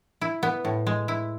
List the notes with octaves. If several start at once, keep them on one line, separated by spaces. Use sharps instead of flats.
E4
B3
A2
G#3
E4